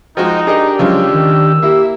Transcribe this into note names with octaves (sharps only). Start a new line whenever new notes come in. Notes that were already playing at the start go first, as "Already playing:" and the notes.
F3 G#3 D#4 F#4 D#5 G5
D4 G4 G#4 A#4 D#5
C#3 F3 F#3 G#3 E6
D#3
A#3 E4 G4 E5